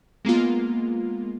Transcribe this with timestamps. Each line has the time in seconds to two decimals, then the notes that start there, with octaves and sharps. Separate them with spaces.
0.25 G#3 A#3 B3 F4